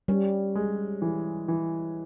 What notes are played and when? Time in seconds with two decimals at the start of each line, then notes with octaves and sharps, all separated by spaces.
0.08 G3 C#4
0.55 G#3
1.02 E3
1.48 E3